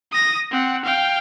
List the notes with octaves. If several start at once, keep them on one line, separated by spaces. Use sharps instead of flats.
D#6 A#6
C4 F#5
F5 G5